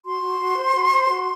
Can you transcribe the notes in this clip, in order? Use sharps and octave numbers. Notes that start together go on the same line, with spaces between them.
F#4 C6
F#4
F#4
C5
F#4
C5
F#4